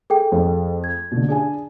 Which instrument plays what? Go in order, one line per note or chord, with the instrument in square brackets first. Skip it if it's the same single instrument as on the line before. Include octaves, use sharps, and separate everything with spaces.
[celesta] G#4 A4 G5
[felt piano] F2 A3
[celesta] G#6
[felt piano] B2 D3
D4 G#4 G#5